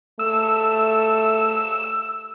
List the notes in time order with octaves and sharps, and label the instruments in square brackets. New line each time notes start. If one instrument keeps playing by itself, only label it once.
[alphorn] A3 [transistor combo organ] E6